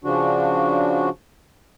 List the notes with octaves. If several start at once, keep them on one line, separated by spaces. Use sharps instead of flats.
C#3 F3 D4 F#4